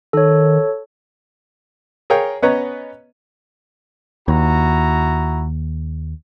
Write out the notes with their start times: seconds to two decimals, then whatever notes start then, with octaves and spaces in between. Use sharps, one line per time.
0.13 D#3 A4 C#5
2.10 G#4 A#4 C#5 F5 G5
2.42 B3 C#4 B4 C#5 D#5 A#5
4.28 D#2 E4 F#4 A#5